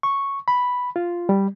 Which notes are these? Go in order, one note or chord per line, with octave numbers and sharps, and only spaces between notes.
C#6
B5
F4
G3